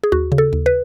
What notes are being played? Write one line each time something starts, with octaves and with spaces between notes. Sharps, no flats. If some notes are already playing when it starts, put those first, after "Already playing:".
G#4
D#2 F#4
C#3
A4
D#2
B4